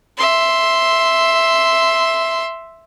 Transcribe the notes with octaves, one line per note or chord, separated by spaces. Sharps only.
E5 C6